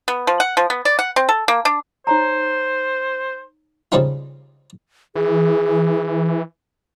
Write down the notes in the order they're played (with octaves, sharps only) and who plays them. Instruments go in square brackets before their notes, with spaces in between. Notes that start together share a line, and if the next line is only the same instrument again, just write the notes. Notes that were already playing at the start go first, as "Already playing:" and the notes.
[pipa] B3
F3
F#5
F3
B3
D5
F#5
C4
A4
A#3
D4
[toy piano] D#4 C#5 A#5 [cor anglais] C5
[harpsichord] C#3 F3 G3 C4 D#4 F4
[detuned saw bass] E3 [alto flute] G#4